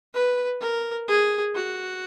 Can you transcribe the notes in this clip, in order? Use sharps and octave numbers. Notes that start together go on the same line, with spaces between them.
B4
A#4
G#4
F#4